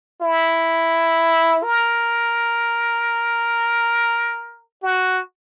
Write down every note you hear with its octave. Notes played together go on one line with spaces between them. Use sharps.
E4
A#4
F#4